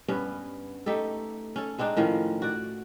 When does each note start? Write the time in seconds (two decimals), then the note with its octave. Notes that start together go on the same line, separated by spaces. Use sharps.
0.08 G2 B3 C#4
0.86 A3 D#4 G4 A4
1.56 C#4 A4
1.79 G#3 C4 D4 D#4
1.97 A2 D#3 F3 C#4
2.42 F#4 D5